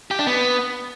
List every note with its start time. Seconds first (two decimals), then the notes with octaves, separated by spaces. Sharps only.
0.11 G4
0.19 D4
0.27 B3